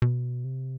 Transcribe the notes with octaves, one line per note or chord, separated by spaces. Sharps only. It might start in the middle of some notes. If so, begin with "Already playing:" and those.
B2
C3